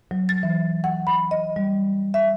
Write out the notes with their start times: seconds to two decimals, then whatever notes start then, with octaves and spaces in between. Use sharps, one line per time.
0.11 F#3
0.29 A6
0.43 E3
0.84 F#5
1.07 B5
1.31 D#5
1.56 G3
2.14 E5